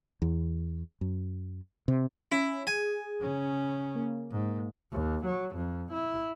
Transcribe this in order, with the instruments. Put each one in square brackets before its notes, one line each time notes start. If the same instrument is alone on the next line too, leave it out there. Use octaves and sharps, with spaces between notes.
[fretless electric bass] E2
F#2
C3
[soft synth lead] C#4 [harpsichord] E4
[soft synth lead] G#4 [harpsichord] G#5
[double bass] C#3 C#4
[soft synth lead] A#3
[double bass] G#2
D#2
F#3
F2
E4